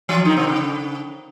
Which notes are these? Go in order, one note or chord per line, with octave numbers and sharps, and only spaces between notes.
F3 F4
D#3 D#4
C3 C4
C#3